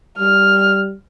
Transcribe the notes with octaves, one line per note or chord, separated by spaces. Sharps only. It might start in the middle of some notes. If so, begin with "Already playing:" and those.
G3 F6